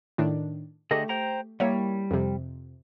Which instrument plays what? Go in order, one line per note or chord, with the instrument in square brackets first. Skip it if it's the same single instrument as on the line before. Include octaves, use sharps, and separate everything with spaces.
[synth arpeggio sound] A2 D#3 D4
[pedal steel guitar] D3 G#4 D#5 [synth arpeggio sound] A3 G4
[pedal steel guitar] C5 G5 A#5
[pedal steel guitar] G3 [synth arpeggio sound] A#3 E4 C#5
[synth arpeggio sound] F2 C3